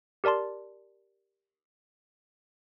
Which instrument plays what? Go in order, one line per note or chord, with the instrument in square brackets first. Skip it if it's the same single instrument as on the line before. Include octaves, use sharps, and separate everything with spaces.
[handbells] G4 A#4 D5 A5 C6